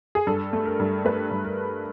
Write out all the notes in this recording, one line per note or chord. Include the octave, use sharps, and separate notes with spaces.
G#4
G2 A4
A3
A#4
G2
A3 B4
G2
A#4